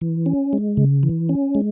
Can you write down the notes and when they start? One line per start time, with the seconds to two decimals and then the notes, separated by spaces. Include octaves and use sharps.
0.01 E3
0.26 C#4
0.53 G#3
0.77 C#3
1.03 E3
1.29 C#4
1.55 G#3